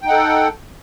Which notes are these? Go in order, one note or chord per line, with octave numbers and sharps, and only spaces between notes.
D#4 A4 F#5 G5